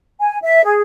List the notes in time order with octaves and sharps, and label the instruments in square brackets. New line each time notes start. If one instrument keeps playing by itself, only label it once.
[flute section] G#5
E5
G#4